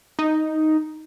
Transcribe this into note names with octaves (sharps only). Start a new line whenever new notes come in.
D#4